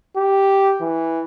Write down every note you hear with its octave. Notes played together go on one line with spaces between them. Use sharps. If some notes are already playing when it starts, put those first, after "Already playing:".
G4
E3